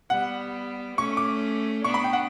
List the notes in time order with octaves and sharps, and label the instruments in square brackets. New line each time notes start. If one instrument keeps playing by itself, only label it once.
[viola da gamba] G3 B3 [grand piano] F#5
[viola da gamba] A3 C#4 [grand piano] C#6
[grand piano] D6
[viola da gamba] B3 D4 [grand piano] C#6
[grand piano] B5
G5
F#5